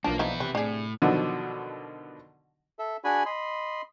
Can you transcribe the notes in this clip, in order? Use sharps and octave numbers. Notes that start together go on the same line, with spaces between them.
B1 F3 A#3 D4 A5
A#3 B3 D#4 E4
C3 B4
A2 D4 G#4
B2 D3 D#3 F3 F#3
A4 E5
D4 F#4 G#4 G#5 B5
D#5 B5 C6